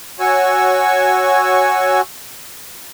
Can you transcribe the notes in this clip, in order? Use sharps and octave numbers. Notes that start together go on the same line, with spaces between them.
F#4 C#5 G#5 C#6 E6